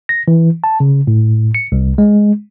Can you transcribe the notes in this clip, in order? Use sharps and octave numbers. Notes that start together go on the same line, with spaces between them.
A#6
E3
A5
C#3
A2
C#7
C2
G#3